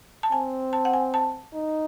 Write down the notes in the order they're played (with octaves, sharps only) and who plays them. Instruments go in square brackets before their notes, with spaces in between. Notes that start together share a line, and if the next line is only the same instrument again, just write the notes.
[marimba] A5
[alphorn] C4 [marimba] G#5
[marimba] A5
F#5
G#5
A5
[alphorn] D#4